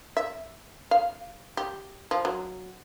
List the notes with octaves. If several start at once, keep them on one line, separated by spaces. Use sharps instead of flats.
E5
F5
G4
F3
F#3